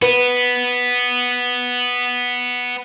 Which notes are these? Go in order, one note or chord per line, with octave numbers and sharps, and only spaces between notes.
B3 B4